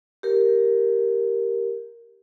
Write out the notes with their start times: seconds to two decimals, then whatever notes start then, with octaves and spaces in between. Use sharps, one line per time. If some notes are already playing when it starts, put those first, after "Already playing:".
0.23 G4 A#4